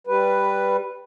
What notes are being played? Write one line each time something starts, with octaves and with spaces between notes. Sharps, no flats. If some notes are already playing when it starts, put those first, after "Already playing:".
G3 B4